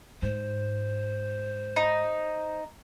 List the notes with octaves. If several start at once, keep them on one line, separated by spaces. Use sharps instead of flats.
G#2 C5
D#4